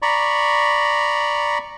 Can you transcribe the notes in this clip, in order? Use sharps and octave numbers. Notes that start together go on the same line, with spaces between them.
D5 A#5 B5 C#6